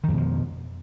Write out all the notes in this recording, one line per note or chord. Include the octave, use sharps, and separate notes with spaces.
F2 B2 D#3 F3